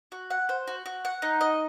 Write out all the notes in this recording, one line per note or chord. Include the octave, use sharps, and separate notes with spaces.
F#4
F#5
C5
F#4
F#4
F#5
D#4
D#5